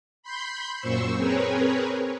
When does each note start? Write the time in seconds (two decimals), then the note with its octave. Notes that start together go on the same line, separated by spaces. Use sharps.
0.23 B5 C6 G6
0.80 F#2 A#2 C5 C#6 E6
1.16 C4 G#4 A#4 B4 C#5